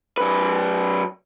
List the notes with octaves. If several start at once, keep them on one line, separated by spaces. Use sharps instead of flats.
F#2 B4